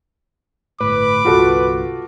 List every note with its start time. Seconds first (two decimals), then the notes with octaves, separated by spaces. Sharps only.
0.80 G1 A2 B4 D6
1.25 G1 C2 F4 F#4 A4